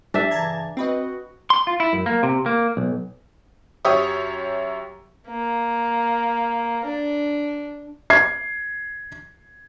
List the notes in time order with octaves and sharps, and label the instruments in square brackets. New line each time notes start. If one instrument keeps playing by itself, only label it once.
[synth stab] G3 [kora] D4 E5
[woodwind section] G2 C#3 E3 [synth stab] A5 A#5 G#6
[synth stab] C4 B4 D#5 [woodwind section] F#4
[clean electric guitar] C6
F4
E4
F#2
A#3
C3
A#3
B1
[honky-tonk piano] F#2 G4 C#5 E5 C#6 D#6
[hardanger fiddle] A#3
D4
[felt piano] G#6 C7